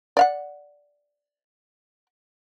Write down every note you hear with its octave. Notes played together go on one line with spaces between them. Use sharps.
D5 F5 F#5